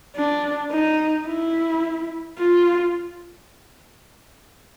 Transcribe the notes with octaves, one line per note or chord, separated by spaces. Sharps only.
D4
D#4
E4
F4